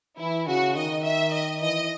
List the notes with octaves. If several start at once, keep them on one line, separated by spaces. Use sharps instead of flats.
E3 E4
C#3 F#4
D#3 D#5
E5
D#5
E3 D#5